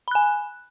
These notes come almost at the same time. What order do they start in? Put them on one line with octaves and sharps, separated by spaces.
B5 F#6 G#5